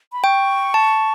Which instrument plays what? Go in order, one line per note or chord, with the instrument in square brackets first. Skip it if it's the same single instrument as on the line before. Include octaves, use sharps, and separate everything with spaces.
[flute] B5
[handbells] G5 [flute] C#6
[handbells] A5